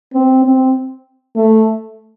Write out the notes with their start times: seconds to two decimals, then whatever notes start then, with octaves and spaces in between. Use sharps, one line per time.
0.13 C4
0.44 C4
1.36 A3